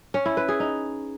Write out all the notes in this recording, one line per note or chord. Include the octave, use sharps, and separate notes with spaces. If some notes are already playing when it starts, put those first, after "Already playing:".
C#4
E4
B4
G#4
D#4